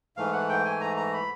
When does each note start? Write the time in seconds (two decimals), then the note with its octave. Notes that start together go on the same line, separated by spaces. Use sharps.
0.17 G#2 E3 A3 F5
0.33 F#5
0.49 G5
0.65 G#5
0.81 A#5
0.97 A#5
1.13 B5